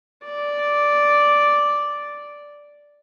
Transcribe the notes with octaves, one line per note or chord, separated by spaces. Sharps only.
D5